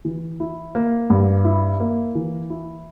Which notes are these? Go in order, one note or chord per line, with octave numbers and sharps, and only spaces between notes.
E3
E4
A#3
G2
E4
A#3
E3
E4